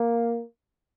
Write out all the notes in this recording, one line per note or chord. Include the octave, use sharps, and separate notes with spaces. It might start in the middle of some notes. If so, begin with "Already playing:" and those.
Already playing: A#3